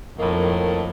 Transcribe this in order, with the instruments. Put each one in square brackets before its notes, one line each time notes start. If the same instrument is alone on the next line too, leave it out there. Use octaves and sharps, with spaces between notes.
[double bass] F2 [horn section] A2 D#3 A#3